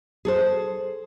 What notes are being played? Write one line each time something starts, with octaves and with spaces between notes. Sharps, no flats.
G#4 A4 C5